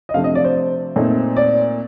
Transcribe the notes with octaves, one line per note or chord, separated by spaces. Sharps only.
D#5
C3 F3 A3 D4 F5
D#5
D5
C5
A#2 A3 C4 D#4
D5